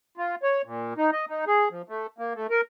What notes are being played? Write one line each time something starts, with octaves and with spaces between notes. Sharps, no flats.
F4
C#5
A#2
D#4
D#5
D#4
G#4
F3
A3
A#3
A3
A#4